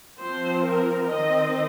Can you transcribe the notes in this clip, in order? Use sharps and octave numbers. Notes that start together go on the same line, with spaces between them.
F3 C4 C5
A#4
D#3 C4 D#5